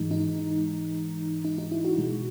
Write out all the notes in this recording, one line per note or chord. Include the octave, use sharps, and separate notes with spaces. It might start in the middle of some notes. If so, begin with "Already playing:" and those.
Already playing: G#2 E3 G#3 D#4
D#4
D#4
D#4
E4
F#4
B2 G#3